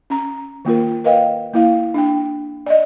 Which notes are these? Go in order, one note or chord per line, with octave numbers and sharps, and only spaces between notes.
C#4 A#5
D#3 A#3 F4 A#4
A#4 B4 D#5 F5 G5
A#3 E4 F5
D4 G5
D5 D#5